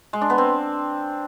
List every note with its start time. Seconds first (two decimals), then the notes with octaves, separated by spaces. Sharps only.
0.13 G#3
0.21 D4
0.30 B3
0.38 C4